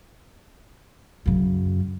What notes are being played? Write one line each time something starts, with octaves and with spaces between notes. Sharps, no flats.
F#2 C#3